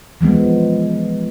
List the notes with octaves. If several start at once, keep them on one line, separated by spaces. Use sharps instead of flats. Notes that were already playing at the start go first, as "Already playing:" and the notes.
E3 F3 G#3 B3